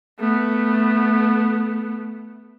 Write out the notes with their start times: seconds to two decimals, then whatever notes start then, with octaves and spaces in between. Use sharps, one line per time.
0.20 A3 B3